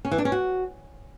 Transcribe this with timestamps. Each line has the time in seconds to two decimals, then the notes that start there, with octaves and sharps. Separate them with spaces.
0.05 C#4
0.11 E3
0.18 D4
0.25 C#4
0.32 F#4